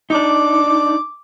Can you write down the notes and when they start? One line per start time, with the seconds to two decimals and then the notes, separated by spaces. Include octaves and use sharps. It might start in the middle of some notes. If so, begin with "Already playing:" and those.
0.10 D4 D#4 D6